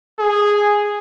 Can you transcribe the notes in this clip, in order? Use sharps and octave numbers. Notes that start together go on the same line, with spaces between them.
G#4